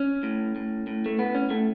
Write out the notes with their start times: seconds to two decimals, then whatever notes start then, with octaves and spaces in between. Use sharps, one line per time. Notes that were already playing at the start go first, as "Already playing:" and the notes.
Already playing: C#4
0.23 A2
0.56 A2
0.87 A2
1.06 A3
1.19 A2 B3
1.35 C#4
1.50 A2 A3